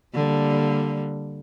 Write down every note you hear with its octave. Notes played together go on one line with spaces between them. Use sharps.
D3 G3 A#3